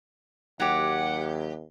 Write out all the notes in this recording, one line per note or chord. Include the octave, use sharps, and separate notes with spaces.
D#2 F#3 G4 F#5